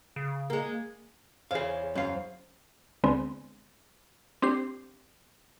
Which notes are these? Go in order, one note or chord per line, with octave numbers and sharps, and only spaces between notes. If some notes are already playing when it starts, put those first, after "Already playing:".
C#3
G#3 A#3
E2 G#4 C5 C#5 F5
F#2 F5
D2 D3 G#3 B3 C4
C4 D4 G4 C7